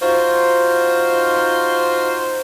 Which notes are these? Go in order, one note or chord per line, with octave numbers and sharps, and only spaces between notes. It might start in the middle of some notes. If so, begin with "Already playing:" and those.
D#4 F4 F#4 C5